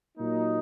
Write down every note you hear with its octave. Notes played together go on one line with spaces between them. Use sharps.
A#2 F#3 A#3 D#4